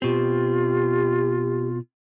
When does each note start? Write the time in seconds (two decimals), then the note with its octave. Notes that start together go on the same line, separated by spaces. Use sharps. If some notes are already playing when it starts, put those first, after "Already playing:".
0.02 B2 C4 F4 G4